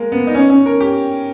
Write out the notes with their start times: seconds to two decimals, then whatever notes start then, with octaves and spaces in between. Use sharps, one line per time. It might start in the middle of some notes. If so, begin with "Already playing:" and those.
Already playing: G#3 A#3
0.12 B3
0.27 D#4
0.35 C#4
0.50 C#4
0.66 A#4
0.80 G4